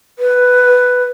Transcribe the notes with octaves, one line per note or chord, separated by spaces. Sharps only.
B4